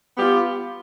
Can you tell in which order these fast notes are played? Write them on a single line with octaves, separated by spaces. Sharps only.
B3 G4 F4